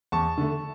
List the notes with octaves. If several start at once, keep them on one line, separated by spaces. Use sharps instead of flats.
E2 A5 C#6
D3 A3